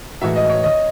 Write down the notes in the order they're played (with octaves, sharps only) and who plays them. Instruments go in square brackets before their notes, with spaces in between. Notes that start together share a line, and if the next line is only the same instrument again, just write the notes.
[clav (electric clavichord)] A2 E3 G#3 D#4 F#4 [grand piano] E5
[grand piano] D#5
C#5
D#5